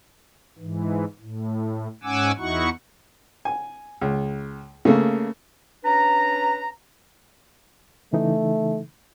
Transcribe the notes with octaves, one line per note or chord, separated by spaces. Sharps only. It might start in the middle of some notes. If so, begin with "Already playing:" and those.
G#2 E3
A2
G#2 C#4 F#5 G#5 D6 E6
E2 D#4 E4 F#4 F#5 C#6
G#5
C#2
C#3 A3 A#3
C#4 D4 B4 A#5
C#3 E3 A3 D#4